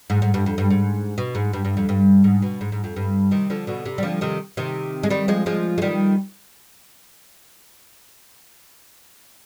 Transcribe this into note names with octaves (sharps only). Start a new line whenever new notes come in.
G#2
G#2
G2
F2
G2
G#2
B2
G#2
G2
G2
F2
G2
G#2
B2
G#2
G#2
F2
G2
C3 D#3
D3 F3
B2 D3
C3
G3
D3 F3
C3 D#3
C3 D#3
G#3
D#3 G3
F3 G#3
F3 G#3
G#3
D#3 G3